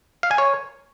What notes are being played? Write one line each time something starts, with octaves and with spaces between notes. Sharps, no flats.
F5
G#5
C#5